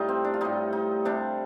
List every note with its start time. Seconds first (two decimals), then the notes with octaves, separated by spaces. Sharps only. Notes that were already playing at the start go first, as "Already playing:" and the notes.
Already playing: A2 G3 D#4 F4
0.09 C4
0.24 D4
0.34 F4
0.41 A2 G3 D#4
0.73 D#4
1.05 C3 G3 D4